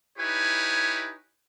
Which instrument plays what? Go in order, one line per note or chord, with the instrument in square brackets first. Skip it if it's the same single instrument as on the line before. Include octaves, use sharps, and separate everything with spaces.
[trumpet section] D#4 E4 G4 B4 C#5 G#5